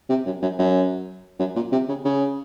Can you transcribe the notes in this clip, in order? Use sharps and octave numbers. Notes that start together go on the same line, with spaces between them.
C3
F#2
F#2
F#2
F#2
A#2
C3
C#3
C#3